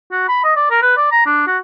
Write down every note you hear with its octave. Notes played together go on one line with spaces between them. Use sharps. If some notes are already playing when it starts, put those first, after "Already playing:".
F#4
B5
D#5
D5
A#4
B4
D5
A#5
D4
F#4